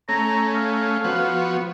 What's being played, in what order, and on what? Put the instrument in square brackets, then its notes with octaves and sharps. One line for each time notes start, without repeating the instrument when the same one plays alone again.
[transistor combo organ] A3 C#4 [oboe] A#5
[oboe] F5
[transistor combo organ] F3 B3 F#4